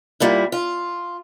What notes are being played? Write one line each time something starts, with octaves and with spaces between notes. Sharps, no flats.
A#2 G3 A#3 E4
F4